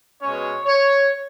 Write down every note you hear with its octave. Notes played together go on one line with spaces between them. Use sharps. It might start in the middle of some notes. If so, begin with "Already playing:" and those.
B2 G#3 C#4 C#5
C#5